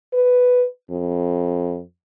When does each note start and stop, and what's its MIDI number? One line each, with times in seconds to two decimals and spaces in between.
0.13 0.65 71
0.90 1.80 41